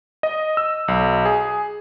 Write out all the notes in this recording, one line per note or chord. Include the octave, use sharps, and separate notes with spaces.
D#5
E6
B1
G#4